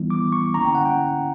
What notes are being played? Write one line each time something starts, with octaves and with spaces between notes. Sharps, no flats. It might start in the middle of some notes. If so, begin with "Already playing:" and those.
Already playing: E3 G3 B3 E4
D6
C#6
D3 A#3 C#4 E4 A#5
G5
F#5
G5